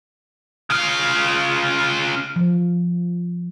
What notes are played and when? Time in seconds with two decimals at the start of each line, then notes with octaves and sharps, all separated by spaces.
0.70 C#3 F4
2.36 F3